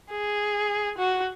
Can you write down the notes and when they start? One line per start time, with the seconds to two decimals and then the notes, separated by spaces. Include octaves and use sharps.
0.11 G#4
0.98 F#4